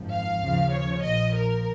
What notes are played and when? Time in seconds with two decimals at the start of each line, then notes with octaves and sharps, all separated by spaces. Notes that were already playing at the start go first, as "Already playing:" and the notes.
Already playing: G#1 F#2 F3
0.10 F5
0.41 D#2 C#3 F3
0.72 C#5
1.03 A#1 A#2 F3 D#5
1.35 A#4